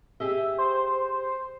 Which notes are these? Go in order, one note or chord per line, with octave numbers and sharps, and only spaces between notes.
G4 G#4 D#5 E5
C5